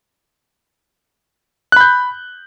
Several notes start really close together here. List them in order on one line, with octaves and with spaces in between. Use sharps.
F#6 B5 G6